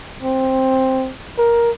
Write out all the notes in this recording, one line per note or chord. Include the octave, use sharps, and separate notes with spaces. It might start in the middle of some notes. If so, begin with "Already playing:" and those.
C4
A#4